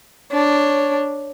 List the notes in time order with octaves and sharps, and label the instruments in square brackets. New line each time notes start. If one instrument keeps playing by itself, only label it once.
[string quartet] D4 [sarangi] C#5